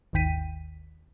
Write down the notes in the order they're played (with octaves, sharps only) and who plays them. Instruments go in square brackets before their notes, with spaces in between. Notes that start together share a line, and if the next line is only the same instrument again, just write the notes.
[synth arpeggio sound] G#1 D#2 D#3 G5 B6 D#7